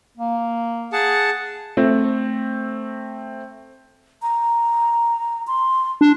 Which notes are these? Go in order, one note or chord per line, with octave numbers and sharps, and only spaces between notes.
A#3
G#4 F#5 A5
A3 C4
A#5
C6
D4